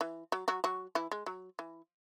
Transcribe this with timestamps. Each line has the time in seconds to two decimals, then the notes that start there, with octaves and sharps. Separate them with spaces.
0.01 E3
0.32 F#3
0.48 F#3 F#4
0.64 F#3 F#4
0.95 E3 E4
1.12 G#3
1.26 F#3
1.59 E3